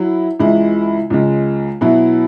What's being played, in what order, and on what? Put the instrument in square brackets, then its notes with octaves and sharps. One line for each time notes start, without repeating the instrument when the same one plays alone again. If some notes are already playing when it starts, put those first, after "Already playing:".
Already playing: [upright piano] F#3 E4
C#2 C#3 E3 G#3 E4
C#2 C#3 G#3
B2 F#3 E4